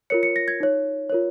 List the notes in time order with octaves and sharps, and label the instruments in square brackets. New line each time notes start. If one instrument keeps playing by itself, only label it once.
[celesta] F4 A#4 C#5 C#7
C#7
A#6
G#6
D#4 C#5
F4 A#4 C#5